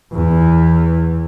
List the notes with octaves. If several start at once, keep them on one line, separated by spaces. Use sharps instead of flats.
E2 E3